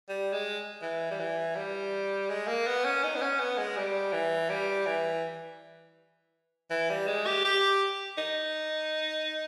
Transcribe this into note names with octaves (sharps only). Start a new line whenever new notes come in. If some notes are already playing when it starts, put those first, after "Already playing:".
G3
G#3
E3
G3
E3
G3
G#3
A#3
B3
C#4
D#4
B3
C#4
B3
G#3
G3
E3
G3
E3
E3
G3
G#3
G4
G4
D#4